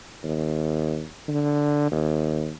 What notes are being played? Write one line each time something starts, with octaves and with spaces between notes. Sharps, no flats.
D#2
D3
D#2